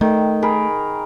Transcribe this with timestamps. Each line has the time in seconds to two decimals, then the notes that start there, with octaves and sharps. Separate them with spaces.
0.01 D#3 A3
0.42 G#4 A#4 B5